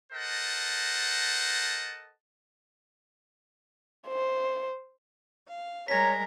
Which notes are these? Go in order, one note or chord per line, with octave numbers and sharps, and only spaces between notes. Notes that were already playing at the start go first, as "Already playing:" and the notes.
A4 A#4 C5 D#5 F#5 A5
C5
F5
G3 G#3 A#4 C#5 A#5 A#6 B6